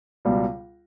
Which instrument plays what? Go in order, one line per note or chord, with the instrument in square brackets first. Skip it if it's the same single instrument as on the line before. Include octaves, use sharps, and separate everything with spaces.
[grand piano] C#2 B2 G3